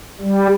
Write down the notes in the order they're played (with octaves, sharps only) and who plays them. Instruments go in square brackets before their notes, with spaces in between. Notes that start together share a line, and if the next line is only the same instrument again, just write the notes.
[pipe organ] G3